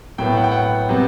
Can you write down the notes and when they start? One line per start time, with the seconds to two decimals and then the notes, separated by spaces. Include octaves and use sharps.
0.18 A2 F#3 B3 G5
0.37 F#5
0.44 G5
0.51 F#5
0.89 C3 F#3 B3